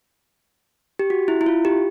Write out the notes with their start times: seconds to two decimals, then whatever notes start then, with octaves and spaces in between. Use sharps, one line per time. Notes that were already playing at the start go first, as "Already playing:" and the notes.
0.99 G4
1.10 F#4
1.28 E4
1.41 E4
1.46 F4
1.65 G4